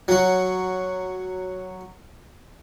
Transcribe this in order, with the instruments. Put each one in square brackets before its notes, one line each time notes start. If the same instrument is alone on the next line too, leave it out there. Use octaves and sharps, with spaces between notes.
[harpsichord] F#3 F#4